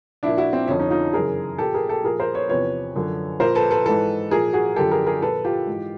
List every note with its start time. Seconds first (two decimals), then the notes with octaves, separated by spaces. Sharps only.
0.23 A#2 F3 D4 E4
0.37 E4 F#4
0.53 C4
0.68 F2 D3 F3 C#4
0.79 C#4 D#4
0.90 D#4 F4
1.13 F#2 C#3 E3 G#4 A#4
1.58 A#2 F3 G4 A4
1.74 G#4 A#4
1.89 G4 A4
2.04 A#2 F3 G#4 A#4
2.20 A#4 C5
2.35 B4 C#5
2.49 E2 C3 F3 B4 C#5
2.96 F#2 D3 F3
3.40 A#2 F3 A#4 C5
3.55 A4 B4
3.71 A4 B4
3.86 G#2 E3 A4 B4
4.31 A#2 F3 G#4 A#4
4.53 F#4 G#4
4.76 F#2 D3 F3 G4 A4
4.91 G#4 A#4
5.06 G#4 A#4
5.22 A#2 F3 A4 B4
5.45 F4 G4
5.67 G#2 E3